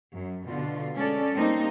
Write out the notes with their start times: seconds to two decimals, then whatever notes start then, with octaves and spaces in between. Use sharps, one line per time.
0.13 F#2
0.48 B2 D3 F4
0.96 G#3 C#4 A4 D5
1.34 G3 A#3 C4 D#4